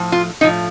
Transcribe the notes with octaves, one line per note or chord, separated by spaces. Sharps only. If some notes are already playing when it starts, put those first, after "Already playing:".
Already playing: A2 F3
F4
A2 F3 D#4